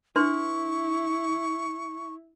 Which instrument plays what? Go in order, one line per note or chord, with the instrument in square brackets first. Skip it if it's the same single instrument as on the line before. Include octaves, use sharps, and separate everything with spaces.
[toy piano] D4 B4 C6 [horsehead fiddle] E4 [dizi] C#6